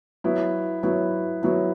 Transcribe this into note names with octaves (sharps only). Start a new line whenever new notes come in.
F#3 B3 E4
F#3 B3 E4
F#3 B3 E4